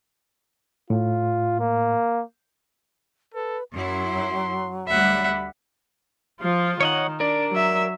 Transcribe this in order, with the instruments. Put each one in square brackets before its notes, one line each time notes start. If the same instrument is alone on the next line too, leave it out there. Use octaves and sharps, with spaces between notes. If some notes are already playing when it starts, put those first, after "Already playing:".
[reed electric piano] A2 [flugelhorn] F4
[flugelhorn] A#3
[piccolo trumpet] A4 [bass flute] B4
[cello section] F#2 E4 [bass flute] F#3 [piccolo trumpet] C6
[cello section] D2 G3 [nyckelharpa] E5 F#5 [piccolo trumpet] B5
[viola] F3 F4
[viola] D#3 [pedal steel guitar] C#5 D#5 F#5
[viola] D4 [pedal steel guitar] A#4 D5
[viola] F#3 E5